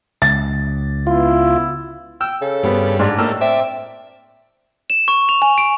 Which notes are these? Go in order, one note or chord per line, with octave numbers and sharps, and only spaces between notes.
C#2 A6
B3 E4 F4
G5 E6
C#3 A4
G2 B3 C5
G#2 G#3 D4 C6
A2 A3 A#3 E6 F6
C4 D5 E5
E7
C#6
F7
G#5
D7